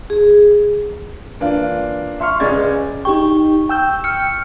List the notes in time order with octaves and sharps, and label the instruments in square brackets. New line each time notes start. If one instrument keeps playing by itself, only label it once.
[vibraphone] G#4
[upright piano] E3 A#3 D4 F4
E5 C6 C#6 F6
C#2 G#3 C#4 D5 G#6 A6
[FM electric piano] D#4 G4 G5 [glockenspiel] C#6
[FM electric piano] G5 E6 G6
[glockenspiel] F6 C#7